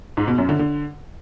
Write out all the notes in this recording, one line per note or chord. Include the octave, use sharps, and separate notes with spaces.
G#2
B2
F#2
D3
D3